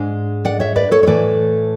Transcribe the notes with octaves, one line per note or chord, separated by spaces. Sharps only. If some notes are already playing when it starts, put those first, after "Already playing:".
Already playing: G#2 G#3 D4
D5 F#5
C#5 E5
B4 D5
A4 C#5
C#5
A2 E3 A3 B4 D5